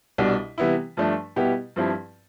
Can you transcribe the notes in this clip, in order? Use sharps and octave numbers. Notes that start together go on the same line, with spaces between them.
C2 B2 G3 D4
C3 E3 G3 B3 E4
G2 F3 A3 D4
B2 G3 B3 E4 G4
G2 F3 C4 E4 G4